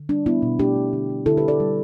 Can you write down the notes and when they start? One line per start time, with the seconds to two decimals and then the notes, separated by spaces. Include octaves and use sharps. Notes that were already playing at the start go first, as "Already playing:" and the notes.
Already playing: D3
0.09 G3 D4
0.26 G3 B3 E4
0.42 B2
0.59 A3 D4 G4
0.76 A3
0.93 D3
1.10 G3
1.26 D3 E4 A4
1.37 G4 B4
1.43 D3
1.48 A4 D5
1.60 G3